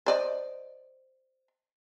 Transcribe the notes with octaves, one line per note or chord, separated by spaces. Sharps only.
C5 D5 D#5